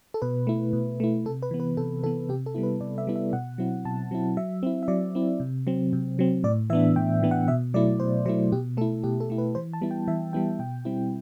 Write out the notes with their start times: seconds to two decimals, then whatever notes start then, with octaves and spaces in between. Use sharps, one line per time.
0.14 A4
0.22 B2 B4
0.47 A3 E4
0.73 B2
1.00 A3 E4
1.25 C3 A4
1.43 B4
1.51 E3 B3
1.60 B4
1.77 C3 A4
2.04 E3 A4
2.06 B3
2.29 C3 G4
2.46 A4
2.54 G3 B3 E4
2.63 B4
2.81 C3 D5
2.98 E5
3.07 G3 B3 E4
3.16 E5
3.33 B2 F#5
3.58 F#3 C4 E4
3.85 B2 A5
4.11 F#3 C4 E4
4.37 F#3 E5
4.63 C4 E4
4.83 E5
4.88 F#3 D5
5.15 C4 E4
5.40 C3
5.67 F#3 C4
5.93 C3
6.19 F#3 C4
6.44 A2 D5
6.70 E3 E5
6.73 B3 D4
6.96 A2 G5
7.23 E3 B3 D4
7.31 F#5
7.48 B2 E5
7.74 F#3 A3 E4 D5
8.00 B2 C5
8.26 F#3 A3 E4 C5
8.52 B2 G4
8.77 A3 A4
8.81 E4
9.04 B2 G4
9.20 A4
9.30 A3 E4
9.38 B4
9.55 E3 C5
9.73 A5
9.81 G3 B3 E4
9.91 G5
10.08 E3 E5
10.33 G3 B3 E4 G5
10.59 B2 G5
10.85 G3 C4 E4